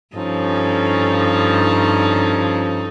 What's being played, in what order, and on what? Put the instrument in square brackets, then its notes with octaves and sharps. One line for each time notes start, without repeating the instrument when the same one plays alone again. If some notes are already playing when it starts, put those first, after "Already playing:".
[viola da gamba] G2 D#4 A4 [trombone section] F3 C#4